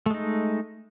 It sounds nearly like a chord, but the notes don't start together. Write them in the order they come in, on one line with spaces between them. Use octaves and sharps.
A3 G#3 D#4